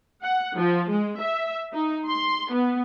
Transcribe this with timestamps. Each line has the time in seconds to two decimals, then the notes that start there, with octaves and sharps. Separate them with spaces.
0.23 F#5
0.56 F3
0.90 G#3
1.20 E5
1.72 D#4
2.08 C6
2.51 B3